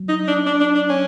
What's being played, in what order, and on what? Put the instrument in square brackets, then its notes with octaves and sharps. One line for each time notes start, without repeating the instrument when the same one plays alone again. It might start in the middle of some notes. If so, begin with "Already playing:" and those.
Already playing: [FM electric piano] F#3
[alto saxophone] D#4
D4
D4
D4
D4
C#4